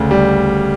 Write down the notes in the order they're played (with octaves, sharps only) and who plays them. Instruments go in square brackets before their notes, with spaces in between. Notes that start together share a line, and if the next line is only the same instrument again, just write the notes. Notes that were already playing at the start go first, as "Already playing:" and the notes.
Already playing: [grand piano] D2 C#3
G3